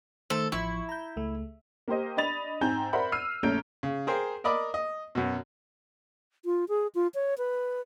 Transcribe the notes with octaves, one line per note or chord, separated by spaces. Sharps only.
D#3 A3 A4 C5
A1 F3 E4 C#6
A#5 G6
C#2 A3
A#3 G4 C5 D#5
D4 D#5 B5 A6 F7
G#2 C4 G#5 A#5 G6
A#4 C5 D5 E5 F#5 B5
E6 F6 C7 D#7
A#1 A3 C#4 A#5 G6 D7
C#3
G#4 A#4 C5 G5
A#4 D5 D#5 B5 D6
D#5
F#2 B2
F4
G#4
F4
C#5
B4